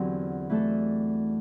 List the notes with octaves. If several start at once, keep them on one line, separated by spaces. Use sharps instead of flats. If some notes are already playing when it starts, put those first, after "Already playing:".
Already playing: E2 D3 F#3 C4 G4
E3 A3 D4 A4